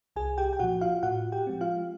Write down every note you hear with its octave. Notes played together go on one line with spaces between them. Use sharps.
C2 G#4 G#5
G4 G5
G5
A#2 F3 F#4 F#5
F4 F5
A2 F#4 F#5
G4 G5
F3 G#3 C4
F4 F5